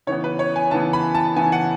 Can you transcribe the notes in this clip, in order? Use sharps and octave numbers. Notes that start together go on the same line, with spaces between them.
C#3 E3 B3 C#5
B4
C#5
G#5
C#3 E3 B3 A5
B5
A5
C#3 E3 B3 G#5
F#5